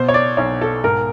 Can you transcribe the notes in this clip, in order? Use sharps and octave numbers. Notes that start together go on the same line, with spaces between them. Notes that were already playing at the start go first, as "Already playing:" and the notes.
Already playing: B2 C5
C#5
D5
B1 C#5
A4
G#2 A#4